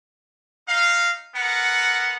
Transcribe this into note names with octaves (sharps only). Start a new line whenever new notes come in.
D#4 F5
B3 A#4 F#5